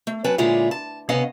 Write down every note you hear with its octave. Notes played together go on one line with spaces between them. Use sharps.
A3
F#3 C#4 B4 G5 A5
A#2 D3 G#3 C#4 E4 F4
A5
D2 C3 B3 C#4 D#5 F5